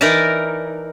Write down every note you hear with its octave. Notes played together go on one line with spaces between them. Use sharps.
E3 D#4 A#4 D5 E5 A5